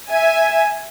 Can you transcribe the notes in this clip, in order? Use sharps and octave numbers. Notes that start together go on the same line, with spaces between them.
E5 G#5